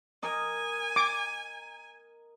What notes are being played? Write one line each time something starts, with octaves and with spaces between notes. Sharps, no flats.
A#4 D#5 G#5
D6